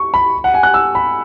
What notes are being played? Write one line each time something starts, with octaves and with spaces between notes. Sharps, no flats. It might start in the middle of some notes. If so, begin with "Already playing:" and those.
Already playing: C#6
B5
F#5
G#5
F#6
E6
B5